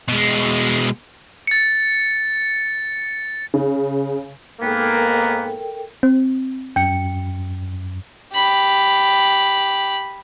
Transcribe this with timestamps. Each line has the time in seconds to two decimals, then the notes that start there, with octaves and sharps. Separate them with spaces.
0.08 B2 G#3
1.47 A6 C#7
3.54 C#3
4.61 G#2 A#3 B3 A4 A#4 G5
6.03 C4
6.76 F#2 G5 C#7
8.33 G4 B5